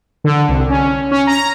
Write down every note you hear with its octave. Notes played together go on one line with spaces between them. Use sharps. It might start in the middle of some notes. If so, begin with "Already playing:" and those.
D3
C2
C#4
C#4
A#5